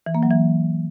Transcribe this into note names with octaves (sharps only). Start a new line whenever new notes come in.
E3
A#3
F#3
E3